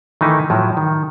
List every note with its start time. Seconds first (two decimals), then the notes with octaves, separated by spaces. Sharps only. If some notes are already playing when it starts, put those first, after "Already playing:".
0.21 D#3 E3 A3 D#4 E4
0.50 A2 F3 F#3
0.77 D#3